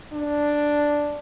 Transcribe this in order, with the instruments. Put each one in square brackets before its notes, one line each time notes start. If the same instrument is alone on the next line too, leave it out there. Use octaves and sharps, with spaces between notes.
[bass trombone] D4